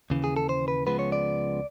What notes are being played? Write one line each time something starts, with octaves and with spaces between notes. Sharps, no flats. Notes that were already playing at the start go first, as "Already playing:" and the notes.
D#2 C#3 E3
G#4
A4
C5
B4
C#2 C#3 F3 G#3 B3 B4
C#5
D5